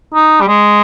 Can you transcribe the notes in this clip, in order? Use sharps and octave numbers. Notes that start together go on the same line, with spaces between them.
D#4
G3
G#3